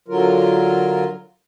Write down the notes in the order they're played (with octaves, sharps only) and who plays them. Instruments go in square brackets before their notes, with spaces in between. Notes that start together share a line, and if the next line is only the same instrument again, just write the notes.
[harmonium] D3 F#3 F4 A#4